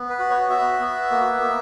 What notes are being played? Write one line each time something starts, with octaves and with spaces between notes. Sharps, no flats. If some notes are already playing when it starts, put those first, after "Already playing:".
Already playing: B3
B4
F#4
C#5
F#4 E5
B3
A#3
A#3